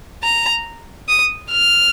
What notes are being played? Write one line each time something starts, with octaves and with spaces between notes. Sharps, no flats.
A#5
D#6
F6